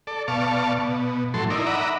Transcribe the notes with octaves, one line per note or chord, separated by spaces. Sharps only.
A4 D5
B2 D5 F5 A5 C#6
B2
A2 E3 F#3 A4 C6
D#4 E4 A#4 D5
D#5 E5 F#5 A#5 B5 D6